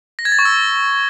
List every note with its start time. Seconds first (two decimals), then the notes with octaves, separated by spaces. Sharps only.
0.19 A#6
0.25 G#6
0.32 A6
0.39 C#6
0.45 E6